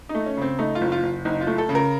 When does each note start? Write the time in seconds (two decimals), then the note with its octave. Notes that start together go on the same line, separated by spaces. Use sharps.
0.09 D#4
0.14 A3
0.26 C#4
0.37 C#3 C4
0.59 A3 D#4
0.75 F4
0.81 F#1
0.92 F4
1.03 F#1
1.25 F#1 D#4
1.41 F4
1.47 A3
1.58 A4
1.69 C#3
1.75 A#4